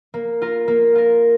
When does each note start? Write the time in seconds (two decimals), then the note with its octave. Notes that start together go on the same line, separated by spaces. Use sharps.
0.14 A#3
0.42 F4 A#4
0.68 A#3
0.95 F4 A#4